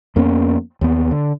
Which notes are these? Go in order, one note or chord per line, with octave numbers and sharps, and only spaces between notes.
F2 A#3 B3 C#4
D#2 B3
D3